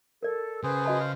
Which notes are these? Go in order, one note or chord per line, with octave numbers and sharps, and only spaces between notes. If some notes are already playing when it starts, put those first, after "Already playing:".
A4 A#4 D5
C#3 G#4 B4 C5
F#4 D#5 A5
C5 F5